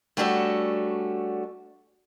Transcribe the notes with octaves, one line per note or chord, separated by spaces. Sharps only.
G3 A3 C#4 D4 F#4 A4